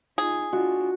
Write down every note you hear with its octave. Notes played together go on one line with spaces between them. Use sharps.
D#4 F4 G#4
D4 F4 F#4